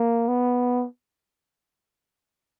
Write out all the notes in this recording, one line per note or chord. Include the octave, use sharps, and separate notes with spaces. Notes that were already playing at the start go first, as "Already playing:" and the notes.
Already playing: A#3
B3